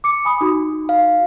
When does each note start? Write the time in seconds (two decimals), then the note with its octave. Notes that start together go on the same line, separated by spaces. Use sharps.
0.04 D6 C#7
0.25 G#5 B5 D#6
0.41 D#4 F#4
0.89 F5